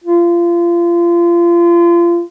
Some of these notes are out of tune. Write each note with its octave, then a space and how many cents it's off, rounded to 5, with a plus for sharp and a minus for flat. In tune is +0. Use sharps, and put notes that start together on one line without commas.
F4 -30